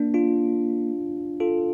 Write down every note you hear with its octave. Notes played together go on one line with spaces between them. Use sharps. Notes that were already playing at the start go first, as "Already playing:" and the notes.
Already playing: A#3 D4
D4 F4
F4 A4